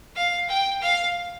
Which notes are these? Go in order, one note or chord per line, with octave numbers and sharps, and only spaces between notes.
F5
G5
F5